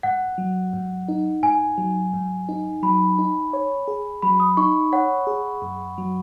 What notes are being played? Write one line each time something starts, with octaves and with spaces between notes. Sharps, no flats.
G#2 F#5
F#3
G#2
D#4
G#2 G#5
F#3
G#2
D#4
F#3 B5
D#4
C#5
G#4
F#3 B5
D#6
D#4 C#6
C#5 F#5
G#4
F#2
F#3